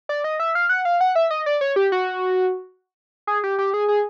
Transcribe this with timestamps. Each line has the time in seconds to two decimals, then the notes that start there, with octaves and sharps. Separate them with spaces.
0.09 D5
0.24 D#5
0.40 E5
0.55 F5
0.69 F#5
0.85 F5
1.01 F#5
1.15 E5
1.30 D#5
1.46 D5
1.61 C#5
1.76 G4
1.92 F#4
3.27 G#4
3.44 G4
3.59 G4
3.74 G#4
3.88 G#4